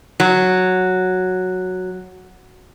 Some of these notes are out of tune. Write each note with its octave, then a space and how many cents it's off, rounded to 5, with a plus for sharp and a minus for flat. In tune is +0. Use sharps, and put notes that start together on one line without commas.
F#3 -5